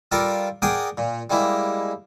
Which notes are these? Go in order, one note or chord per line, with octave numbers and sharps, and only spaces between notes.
G3 F4 A4 A#4 D5
G#4 A#4 D5 F#5 G5 D#6
A#2
G3 G#3 A#3 E4